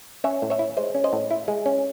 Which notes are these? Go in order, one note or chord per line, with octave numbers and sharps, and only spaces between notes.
C#4 C#5 E5
A2
C#5 E5
E4
G#3 C5 D#5
C#4
C5 D#5
A2
E4
G#3
C#4